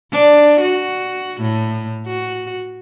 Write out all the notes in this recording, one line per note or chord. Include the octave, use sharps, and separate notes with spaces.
D4
F#4
A2
F#4